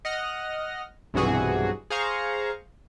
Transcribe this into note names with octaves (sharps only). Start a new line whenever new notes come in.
D#5 F#5 F6 A#6
B1 G2 C3 E3 F#4 G#4
G#4 C5 F5 A#5 C#6